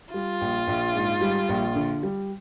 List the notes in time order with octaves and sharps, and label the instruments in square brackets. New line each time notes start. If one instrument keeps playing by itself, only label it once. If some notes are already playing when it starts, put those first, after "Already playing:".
[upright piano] G3 [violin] F4
[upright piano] A#1
A#1
G#2
G3
A#1
D3
G3